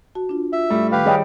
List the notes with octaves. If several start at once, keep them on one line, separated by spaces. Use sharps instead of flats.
F#4 A5
D4 F4
F4 E5
A2 G3 A3
D#3 G4 B4 F5
G3 G#4 C#5 D#5 G5